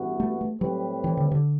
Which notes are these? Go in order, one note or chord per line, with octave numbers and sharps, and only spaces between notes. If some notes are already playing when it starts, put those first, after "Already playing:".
Already playing: A1 G2 E3 B3 F#4
A3
A3
A2 F#3 G3 C4 G4 B4
E3
D3
D3